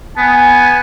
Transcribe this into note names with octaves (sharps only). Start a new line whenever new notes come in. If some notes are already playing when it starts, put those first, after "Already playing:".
B3 G#5